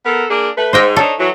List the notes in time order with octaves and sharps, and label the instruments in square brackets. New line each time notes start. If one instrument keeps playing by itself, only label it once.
[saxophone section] B3 A4 A#4
A#3 D4 G#4
A3 B4
[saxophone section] G#2 [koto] C5 D#5 G5
[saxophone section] D4 D#4 C#5 [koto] A4
[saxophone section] E3 F#3